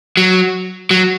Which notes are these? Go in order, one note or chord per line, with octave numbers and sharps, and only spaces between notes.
F#3
F#3